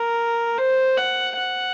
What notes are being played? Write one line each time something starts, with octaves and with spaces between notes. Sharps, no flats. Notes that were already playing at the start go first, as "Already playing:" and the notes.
Already playing: A#4
C5
F#5
F#5